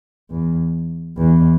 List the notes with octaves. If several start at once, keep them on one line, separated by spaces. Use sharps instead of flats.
E2
E2